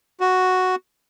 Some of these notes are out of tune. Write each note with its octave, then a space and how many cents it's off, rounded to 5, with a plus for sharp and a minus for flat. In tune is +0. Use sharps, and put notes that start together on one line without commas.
F#4 +0